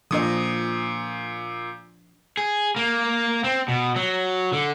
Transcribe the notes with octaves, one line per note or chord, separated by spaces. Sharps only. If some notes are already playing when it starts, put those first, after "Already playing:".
A#2 F3 D4 D#5 D#6
G#4
A#3
C4
B2
F#3
D3